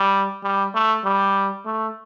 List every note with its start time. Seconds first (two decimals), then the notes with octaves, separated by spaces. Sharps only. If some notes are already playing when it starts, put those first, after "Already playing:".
Already playing: G3
0.43 G3
0.74 A3
1.05 G3
1.66 A3